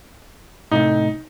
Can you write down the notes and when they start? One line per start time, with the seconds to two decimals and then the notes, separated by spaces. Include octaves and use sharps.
0.71 A2 C3 A3 D#4